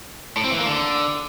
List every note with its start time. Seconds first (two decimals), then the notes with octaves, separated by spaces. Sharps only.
0.37 A2
0.44 C4
0.51 E3
0.59 A#3
0.66 D3